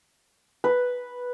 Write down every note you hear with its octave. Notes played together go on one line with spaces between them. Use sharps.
B4